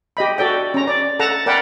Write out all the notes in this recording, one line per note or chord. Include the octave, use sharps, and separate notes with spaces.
G4 D#5 B5
F#4 A4 D5 G5
C#4 A#5
D5
A4 F#5 A5 A#5
A#4 D5 F#5 G5 B5